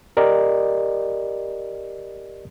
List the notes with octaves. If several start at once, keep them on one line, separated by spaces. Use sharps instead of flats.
G4 A#4 D5 D#5